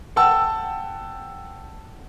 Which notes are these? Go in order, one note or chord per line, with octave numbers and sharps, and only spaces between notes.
F#5 G5 A5 E6